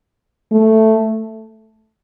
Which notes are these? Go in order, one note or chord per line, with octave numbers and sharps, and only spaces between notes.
A3